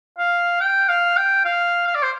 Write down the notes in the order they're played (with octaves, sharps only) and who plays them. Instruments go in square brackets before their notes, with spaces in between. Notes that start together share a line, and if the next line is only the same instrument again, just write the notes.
[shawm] F5
G5
F5
G5
F5
F5
D5
C5